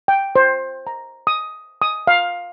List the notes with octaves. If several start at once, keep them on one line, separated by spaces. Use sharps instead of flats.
G5
C5
A#5
D#6
D#6
F5